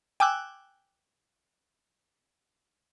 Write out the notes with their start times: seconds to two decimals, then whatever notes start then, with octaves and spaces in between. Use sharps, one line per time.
0.20 G5 G#5 D6 E6 F#6